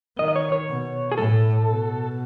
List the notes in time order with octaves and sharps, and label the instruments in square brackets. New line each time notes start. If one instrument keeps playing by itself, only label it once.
[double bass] D#3 [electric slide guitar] D#5
[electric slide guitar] D#5
C#5
C#5
[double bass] B2
[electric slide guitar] G#4
[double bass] A2 [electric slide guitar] A4
[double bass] B2